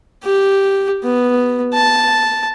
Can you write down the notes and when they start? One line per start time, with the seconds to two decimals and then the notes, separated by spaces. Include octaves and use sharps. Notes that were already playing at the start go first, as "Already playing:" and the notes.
0.23 G4
1.04 B3
1.74 A5